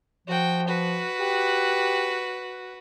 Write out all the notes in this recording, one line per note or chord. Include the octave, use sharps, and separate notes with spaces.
F3 F#4 G5
F#4 B4
G4